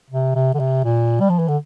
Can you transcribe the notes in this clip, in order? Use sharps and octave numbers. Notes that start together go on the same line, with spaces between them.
C3
C3
D3
C3
A#2
G3
F3
E3
D3